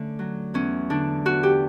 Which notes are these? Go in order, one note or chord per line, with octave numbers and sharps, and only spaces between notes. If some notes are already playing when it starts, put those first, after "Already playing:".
Already playing: D3 A3 C#4
F#3
E2 C#4
D3 D4
E2 F#4
G4